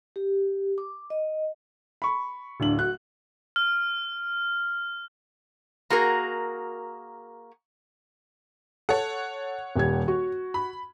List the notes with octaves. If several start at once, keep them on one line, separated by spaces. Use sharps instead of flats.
G4
D6
D#5
B5 C#6
D1 D4 F#7
F#4 F#6
F6
A#3 F#4 G#4 A#4
A4 C#5 F#5
D#1 G3 G#6
F#4
B5